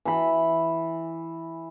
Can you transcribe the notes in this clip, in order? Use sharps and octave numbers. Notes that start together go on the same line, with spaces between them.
E3 B5